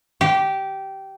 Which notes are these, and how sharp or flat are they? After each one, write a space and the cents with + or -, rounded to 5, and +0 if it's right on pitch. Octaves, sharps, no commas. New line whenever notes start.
G4 -15